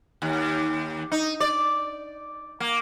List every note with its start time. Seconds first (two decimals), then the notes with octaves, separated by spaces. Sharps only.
0.22 D#2
1.12 D#4
1.40 D5
2.60 A#3